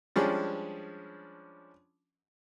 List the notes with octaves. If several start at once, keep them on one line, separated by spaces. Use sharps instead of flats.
F3 G3 G#3 C#4 D4